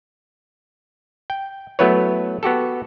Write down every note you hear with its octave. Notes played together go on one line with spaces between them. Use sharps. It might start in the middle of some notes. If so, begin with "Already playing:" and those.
G5
F#3 A3 B3 E4 B4 C#5
B3 F#4 G4 A4